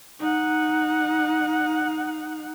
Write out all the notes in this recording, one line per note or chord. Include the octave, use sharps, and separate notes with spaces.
D#4 F#5